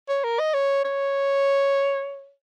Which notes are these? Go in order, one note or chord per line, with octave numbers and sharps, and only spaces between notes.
C#5
A#4
D#5
C#5
C#5